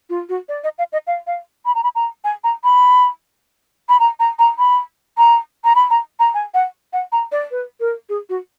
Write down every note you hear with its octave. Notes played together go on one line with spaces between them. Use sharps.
F4
F#4
D5
D#5
F5
D#5
F5
F5
B5
A#5
B5
A#5
G#5
A#5
B5
B5
A#5
A#5
A#5
B5
A#5
A#5
B5
A#5
A#5
G#5
F#5
F#5
A#5
D5
B4
A#4
G#4
F#4